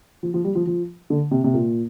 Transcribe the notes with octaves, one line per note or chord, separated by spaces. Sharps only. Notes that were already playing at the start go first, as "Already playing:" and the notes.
F3
F3
G3
F3
F3
D3
C3
C3
A#2